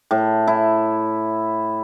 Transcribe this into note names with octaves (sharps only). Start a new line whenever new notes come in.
A2
E4